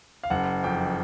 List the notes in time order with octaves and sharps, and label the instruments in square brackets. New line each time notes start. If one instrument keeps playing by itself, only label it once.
[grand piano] F5
F#1 F#5
F2 G5